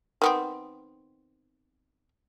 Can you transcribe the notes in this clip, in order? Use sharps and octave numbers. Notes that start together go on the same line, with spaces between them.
D#3 B3 C4